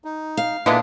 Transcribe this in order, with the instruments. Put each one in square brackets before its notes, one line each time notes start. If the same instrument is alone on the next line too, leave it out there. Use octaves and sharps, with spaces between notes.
[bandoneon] D#4
[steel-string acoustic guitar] F5
[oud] A#2 B3 E4 [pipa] D3 G#3 D4 [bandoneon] A#3